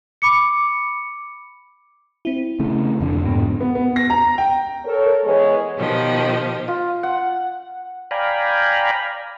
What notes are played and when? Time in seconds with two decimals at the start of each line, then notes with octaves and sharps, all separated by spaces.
0.22 B5 D6 C#7
2.25 C4 E4
2.60 C#3 A3
3.00 F1 F2 D3
3.26 G#2 B3
3.60 B3
3.75 B3
3.96 A#6
4.10 A#5
4.38 G5
4.85 A4 A#4 C#5
5.25 E3 G#3 B3 G#4 C#5
5.77 B2 D#3 F3 G4 D#5
6.68 F4
7.03 F#5
8.11 D5 F5 G5 G#5 A#5 B5